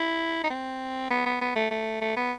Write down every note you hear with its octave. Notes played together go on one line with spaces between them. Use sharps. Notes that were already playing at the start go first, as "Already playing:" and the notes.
Already playing: E4
D#4
C4
B3
B3
B3
A3
A3
A3
B3